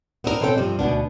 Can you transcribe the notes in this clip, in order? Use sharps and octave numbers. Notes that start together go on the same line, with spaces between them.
B3 C4 D4 E4 A#4
B2 C4 C#4 A4 B4 G5
G2 C3 F3 C4
D2 B2 B3 D4